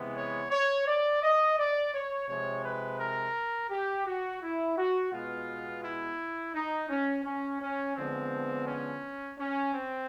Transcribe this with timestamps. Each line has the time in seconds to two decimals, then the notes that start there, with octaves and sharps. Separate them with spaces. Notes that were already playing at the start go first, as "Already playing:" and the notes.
Already playing: C3 E3 G#3 B3
0.16 C#5
0.51 C#5
0.87 D5
1.23 D#5
1.58 D5
1.94 C#5
2.28 C3 F3 G#3 C#5
2.64 B4
3.00 A#4
3.70 G4
4.06 F#4
4.42 E4
4.76 F#4
5.12 B2 G#3 B3 F4
5.83 E4
6.54 D#4
6.89 C#4
7.24 C#4
7.61 C#4
7.95 D3 F3 G#3 B3 C4
8.67 C#4
9.38 C#4
9.72 C4